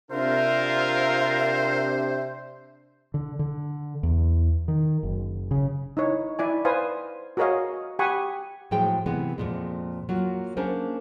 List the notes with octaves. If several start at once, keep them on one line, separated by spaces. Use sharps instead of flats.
C3 D4 F4 A#4 C5 E5
D3
D3
E2
D#3
F#1
C#3
D#4 E4 C#5
E4 D5 G#5
B4 C5 F5 G#5 D#6
F#4 G#4 A#4 C#5 D#5 F5
G4 F#5 G#5 B5 C#6 D#6
A2 F3 F#3 G#3 G#4 G5
C3 E3 G#3 B3
F2 A#2 G#3
F#3 A#3 F4 F#4
A#3 C#4 D4 G#4 A#4 C5